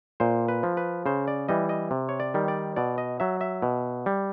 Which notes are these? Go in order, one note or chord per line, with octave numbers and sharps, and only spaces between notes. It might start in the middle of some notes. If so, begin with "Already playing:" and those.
A#2 C5
B4
F3
B4
C#3 C5
D5
E3 G3 D#5
D#5
C3
C#5
D5
D#3 G3
D5
B2 D5
D#5
F#3 E5
E5
B2
G3